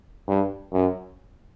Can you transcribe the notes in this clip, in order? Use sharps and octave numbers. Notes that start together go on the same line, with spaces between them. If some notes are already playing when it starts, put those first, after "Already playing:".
G2
F#2